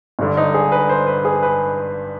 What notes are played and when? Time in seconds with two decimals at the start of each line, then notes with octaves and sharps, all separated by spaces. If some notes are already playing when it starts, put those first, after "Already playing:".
0.19 G1 G2 D3
0.37 D#4
0.54 G#4
0.72 B4
0.89 C5
1.07 B4
1.25 G#4
1.43 B4